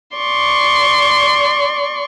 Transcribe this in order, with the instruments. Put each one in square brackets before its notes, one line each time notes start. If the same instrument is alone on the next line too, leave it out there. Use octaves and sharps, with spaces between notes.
[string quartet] D5 C6 C#6